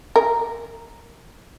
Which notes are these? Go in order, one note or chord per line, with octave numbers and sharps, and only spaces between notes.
A#4